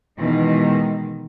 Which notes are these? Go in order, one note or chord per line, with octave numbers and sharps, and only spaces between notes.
B2 D#3 E3 G#3 D#4